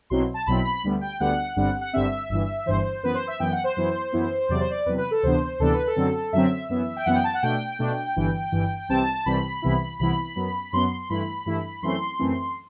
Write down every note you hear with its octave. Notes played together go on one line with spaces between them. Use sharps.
B1 B2 F#3 C4 E4 C6
A5
B1 B2 F#3 C4 E4 B5
B5
D2 D3 G3 B3
G5
D2 D3 G3 B3 F#5
G1 G2 D3 G3 C4
F#5
G1 G2 D3 G3 C4 E5
G1 G2 E3
G1 G2 E3 C5
F#2 E3 B3 B4
C5
E5
F#2 E3 B3 G5
F#5
C5
F#2 E3 B3 E4
F#2 E3 B3 E4
E2 C3 F#3 D5
C5
D5
E2 C3 F#3 B4
B4
A4
D2 C3 E3 B3 D4 C5
D2 C3 E3 B3 D4 A4
B4
A4
F#2 D3 F#3 C4
F#2 D3 F#3 C4 E5
F#2 E3 B3
G5
F#2 E3 B3 F#5
G5
A5
F#5
B2 A3 D4 G5
B2 A3 D4
G1 G2 E3
G1 G2 E3
C2 C3 E3 G3 C4 A5
C2 C3 E3 G3 C4 B5
C2 C3 E3 B3 E4
C2 C3 E3 B3 E4 B5
F#2 F#3 B3
F#2 F#3 B3 C6
C6
G2 E3 A3 E4 B5
G2 E3 A3 E4
F#2 E3 A3 C4 C6
F#2 E3 A3 C4